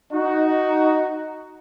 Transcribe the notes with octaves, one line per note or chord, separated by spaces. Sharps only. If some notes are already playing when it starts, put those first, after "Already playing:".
D#4 F#4